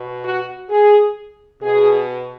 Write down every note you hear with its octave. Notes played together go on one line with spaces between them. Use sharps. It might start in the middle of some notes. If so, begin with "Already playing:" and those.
Already playing: B2
F#4
G#4
B2 G#4